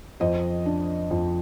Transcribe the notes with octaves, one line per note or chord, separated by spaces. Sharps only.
F2 C5 D#5
D4
F2